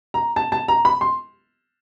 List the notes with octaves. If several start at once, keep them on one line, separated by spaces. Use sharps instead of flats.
A#5
A5
A5
A#5
B5
C6